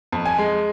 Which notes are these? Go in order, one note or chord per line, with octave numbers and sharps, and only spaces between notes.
F2
G#5
G#3